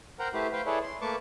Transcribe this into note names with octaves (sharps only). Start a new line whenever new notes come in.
A#4 C5 F#5 G5 A#5
A3 E4 G4 B4 C5
B4 C5 F5 G5
E4 G#4 A4 B4 C#5 D5
C6
A3 A#3 B4 A5 C#6 D6